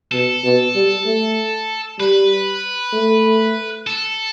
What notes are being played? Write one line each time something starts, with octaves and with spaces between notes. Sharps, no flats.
B2 A4
B2
G3
A3
G3 B4
A3
A4